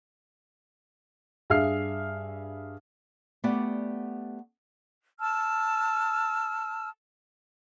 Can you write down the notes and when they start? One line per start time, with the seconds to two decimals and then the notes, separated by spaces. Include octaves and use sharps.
1.50 G2 G#4 E5 F5 F6 C7
3.44 A3 B3 G4 D5 F#5
5.20 A5 E6 F6